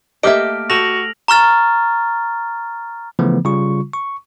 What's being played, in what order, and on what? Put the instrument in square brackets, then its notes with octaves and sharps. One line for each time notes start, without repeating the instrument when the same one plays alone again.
[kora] A3 A#3 G4 [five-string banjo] D#5 E5 [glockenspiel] F6 D7
[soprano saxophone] F#4 [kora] A4 G5 [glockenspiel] A#6 F7 F#7
[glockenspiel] A#5 C#6 F6 A6
[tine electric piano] C#3 E3 F3 A3 B3
C#3 G3 F4 C#6
C#6